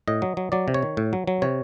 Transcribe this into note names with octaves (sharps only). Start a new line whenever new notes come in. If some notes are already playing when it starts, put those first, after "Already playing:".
A2 D#5
F#3
F#3
F#3 D5
C3
C#5
D#3
A2
F#3
F#3
C3 C#5